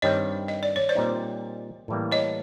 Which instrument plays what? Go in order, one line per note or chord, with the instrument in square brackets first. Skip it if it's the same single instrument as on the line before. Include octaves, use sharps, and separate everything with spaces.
[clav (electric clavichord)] G2 D#3 G3 C4 [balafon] C#5 D#5
[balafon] D#5
D5
C#5
C5 D5
[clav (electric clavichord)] A#2 G3 C4 D#4
A2 E3 G3 A#3
[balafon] C#5 D#5